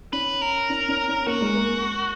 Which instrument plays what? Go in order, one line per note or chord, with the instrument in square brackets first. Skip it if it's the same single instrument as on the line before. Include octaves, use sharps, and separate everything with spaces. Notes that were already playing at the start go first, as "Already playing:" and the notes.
[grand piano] C#4 [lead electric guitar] B4
[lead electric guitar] A#4
[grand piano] C#4
C#4
C#4
[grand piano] A#3 [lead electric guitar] F#4
[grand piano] G#3
A#3